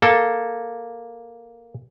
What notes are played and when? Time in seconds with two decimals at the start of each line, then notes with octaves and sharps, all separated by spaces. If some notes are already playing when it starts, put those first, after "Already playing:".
0.02 A#3 A4